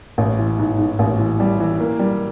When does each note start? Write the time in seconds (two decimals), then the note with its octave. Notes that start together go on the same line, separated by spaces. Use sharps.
0.18 A1
0.39 E3
0.59 G#2
0.78 G#2
0.99 A1
1.18 E3
1.40 G3
1.60 E3
1.80 A#3
1.99 G3